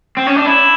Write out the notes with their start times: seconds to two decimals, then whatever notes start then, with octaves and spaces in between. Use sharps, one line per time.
0.17 C4
0.27 C#4
0.36 D4
0.46 E4